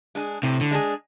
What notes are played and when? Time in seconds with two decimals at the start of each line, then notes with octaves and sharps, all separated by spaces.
0.15 G#3 D4 G#4
0.43 A2 C3
0.61 D3
0.71 G#3 D4 G#4